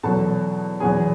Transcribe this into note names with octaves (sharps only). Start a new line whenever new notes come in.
E2 B2 F#3 A4 A5
E2 B2 F#3 G#4 G#5